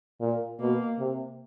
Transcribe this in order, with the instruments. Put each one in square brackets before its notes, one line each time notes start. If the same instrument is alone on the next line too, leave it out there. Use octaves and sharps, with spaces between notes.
[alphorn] A#2
[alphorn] B2 [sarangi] A#3
[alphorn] C3